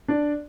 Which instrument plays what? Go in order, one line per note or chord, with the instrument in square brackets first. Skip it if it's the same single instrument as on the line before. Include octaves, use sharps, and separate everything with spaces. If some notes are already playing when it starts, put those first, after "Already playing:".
[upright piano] D4 D5